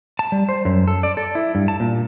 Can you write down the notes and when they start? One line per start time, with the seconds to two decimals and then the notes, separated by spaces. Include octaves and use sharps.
0.19 A5
0.32 G3
0.49 C5
0.65 F#2
0.88 A4
1.03 D5
1.17 A4
1.35 E4
1.55 G2
1.68 A5
1.80 A#2